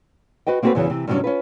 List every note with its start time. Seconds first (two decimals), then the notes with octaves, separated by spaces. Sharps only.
0.47 F#4 B4 D#5 G5
0.62 A#3 C4 C#4 F#4 A4 B4
0.75 E2 C#3 E3 F#3 C#4
0.90 C3 E3
1.07 G2 C3 F#3 A3 C#4 D4
1.24 C#4 F4 B4